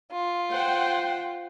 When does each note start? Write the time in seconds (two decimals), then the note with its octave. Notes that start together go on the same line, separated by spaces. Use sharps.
0.12 F4
0.53 C5 F#5 G5